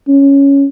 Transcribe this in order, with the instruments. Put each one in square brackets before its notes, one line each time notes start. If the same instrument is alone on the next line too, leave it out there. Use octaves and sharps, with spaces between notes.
[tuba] C#4